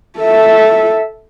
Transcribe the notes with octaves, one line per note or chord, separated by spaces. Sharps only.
A4 E5